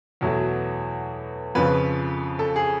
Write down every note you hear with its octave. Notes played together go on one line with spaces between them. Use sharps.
E2 B2 F#3 A3
F2 C#3 F3 B4
A4
G#4